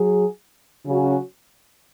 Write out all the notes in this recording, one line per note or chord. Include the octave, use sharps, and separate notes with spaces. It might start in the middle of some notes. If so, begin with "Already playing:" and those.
Already playing: F#3 G#4
C#3 F#3 C#4 F#4